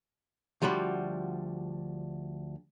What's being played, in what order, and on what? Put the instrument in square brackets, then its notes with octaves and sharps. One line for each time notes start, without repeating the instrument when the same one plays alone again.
[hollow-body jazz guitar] D2 F3 G3 F#4 B5